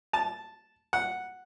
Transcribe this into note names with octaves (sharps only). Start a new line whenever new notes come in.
A5
F#5